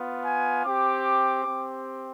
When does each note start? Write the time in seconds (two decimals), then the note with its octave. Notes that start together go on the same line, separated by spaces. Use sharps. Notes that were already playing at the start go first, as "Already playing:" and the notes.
Already playing: B3 F4
0.24 G#5
0.63 C4 G4 D6
1.43 C4 G4